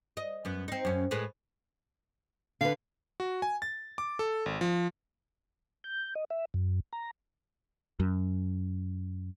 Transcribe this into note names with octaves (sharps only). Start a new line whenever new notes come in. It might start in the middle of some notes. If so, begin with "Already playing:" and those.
D#5
F#2 B3
C4 D#4
F#2 C#4
A2 G#3 B4
D3 B4 F5
F#4
G#5
A6
D6
A4
G#1
F3
G6
D#5
E5
F#2
A#5
F#2